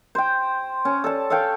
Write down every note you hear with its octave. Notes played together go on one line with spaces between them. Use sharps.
C5 G5
C#4
A4 D5 A5
A4 C#5 F5 G5